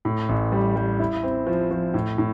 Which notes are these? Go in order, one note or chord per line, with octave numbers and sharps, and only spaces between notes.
A2
A1
G3
G3
E4
C4
F3
F3
A2
A2